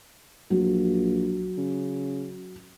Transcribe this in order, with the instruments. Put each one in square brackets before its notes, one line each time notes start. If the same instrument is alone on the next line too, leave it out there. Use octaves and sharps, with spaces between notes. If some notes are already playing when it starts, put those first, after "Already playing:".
[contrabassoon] A#1 [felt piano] F#3
[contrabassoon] C#3